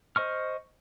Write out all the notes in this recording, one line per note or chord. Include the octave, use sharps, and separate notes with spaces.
C5 D#5 C#6 F6